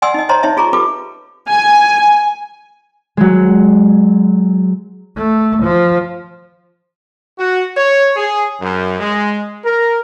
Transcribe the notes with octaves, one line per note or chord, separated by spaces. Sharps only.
D5 F#5 G#5 C6 D#6 E6
D#4 D#5
C5 C#5 D#5 A5 A#5 C6
D#4 C#5 D#5 E5 A5
F4 G#4 A#5 C#6
F4 G4 A4 B4 D6
G#5
F#3 G#3
A3
F3
F#4
C#5
G#4
F#2
G#3
A#4